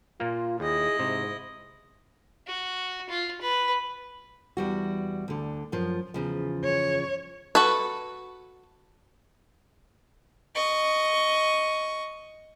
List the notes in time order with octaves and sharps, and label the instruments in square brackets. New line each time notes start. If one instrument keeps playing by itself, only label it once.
[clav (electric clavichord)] A#2 A#3 [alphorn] F4
[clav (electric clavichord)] D#2 [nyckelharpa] E4 D#5 [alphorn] G#4
[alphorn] G#2 [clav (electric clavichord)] C3
[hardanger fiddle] F#4
F4
B4
[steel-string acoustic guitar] E2 G3 F#4
D2 D3
F#2 F3
E2 C#3 F3
[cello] C#5
[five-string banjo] F#4 A4 B4
[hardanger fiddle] D#5 C#6